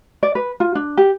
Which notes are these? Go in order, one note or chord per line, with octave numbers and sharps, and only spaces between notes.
D5
B4
F4
D4
G4